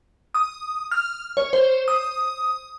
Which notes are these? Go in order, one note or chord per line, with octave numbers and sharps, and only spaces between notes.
D#6
F6
C#5
C5
D#6